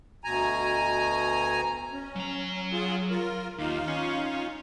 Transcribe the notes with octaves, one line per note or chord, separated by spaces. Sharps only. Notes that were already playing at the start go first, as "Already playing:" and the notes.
D2 B2 G#5 A#5
C#4
F#3 A#5
F4 G#4
F4 A#4
D#2 D#4 F4 F5
C#4